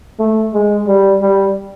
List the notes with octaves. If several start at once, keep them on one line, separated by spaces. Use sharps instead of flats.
A3
G#3
G3
G3